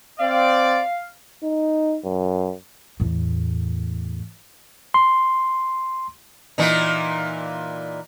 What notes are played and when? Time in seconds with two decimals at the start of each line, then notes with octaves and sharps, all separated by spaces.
0.20 C4 D5 F5
1.43 D#4
2.05 F#2
3.00 E2 A2
4.94 C6
6.58 A#2 E3 D#4